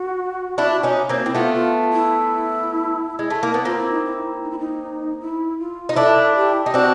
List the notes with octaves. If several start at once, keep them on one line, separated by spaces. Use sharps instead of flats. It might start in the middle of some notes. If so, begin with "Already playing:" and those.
Already playing: F#4
D4 E4
C#4 D#4
A#3 C4
C4 E4
A3 B3 F4
F4
E4
G#3
A3
A#3
B3
A#3 C4 F4
E4
D#4
E4
D#4
E4
D#4
E4
F4
D#4
D4 E4 A4
G4
D#4
C4 D4 F#4